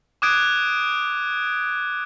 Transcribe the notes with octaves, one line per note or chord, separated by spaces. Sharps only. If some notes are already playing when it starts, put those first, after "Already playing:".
D6 D#6 F#6 G#6 D7